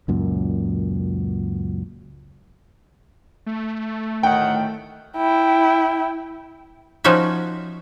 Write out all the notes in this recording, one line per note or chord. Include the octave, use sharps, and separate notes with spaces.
C#2 F#2 A#2
A3
D2 A2 D#3 F#5 G5
E4 G5
F3 C#4 D#4 F#4 E5